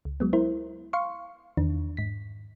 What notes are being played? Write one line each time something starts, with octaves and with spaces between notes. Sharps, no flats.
C#2
F#3 G#3 B3
E4 A#4 C5
F5 C6 C#6
E2 D#3 D4
G#2 B6